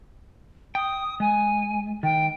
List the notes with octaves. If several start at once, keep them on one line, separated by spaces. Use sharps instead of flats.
G5 D#6
G#3 G#5
D#3 G5